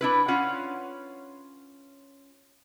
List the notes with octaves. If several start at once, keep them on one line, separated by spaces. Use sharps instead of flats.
D4 E4 B4
C#4 F4 F#5